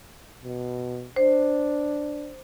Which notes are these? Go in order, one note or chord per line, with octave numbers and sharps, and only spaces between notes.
B2
D4 C5